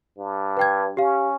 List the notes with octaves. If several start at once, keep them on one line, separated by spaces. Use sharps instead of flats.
G2
B4 G5 G#6
C#4 G4 F5